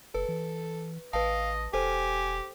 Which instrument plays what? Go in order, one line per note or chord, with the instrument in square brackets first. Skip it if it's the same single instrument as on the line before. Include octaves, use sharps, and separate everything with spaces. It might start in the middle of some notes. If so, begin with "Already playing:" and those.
[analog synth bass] F#1 [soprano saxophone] A4 [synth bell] B4
[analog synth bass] E3
[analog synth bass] A1 [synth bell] B4 A5 [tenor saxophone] D#5 [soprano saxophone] F5
[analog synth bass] E1 [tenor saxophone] G4 [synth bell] A4 C5 [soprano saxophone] G#5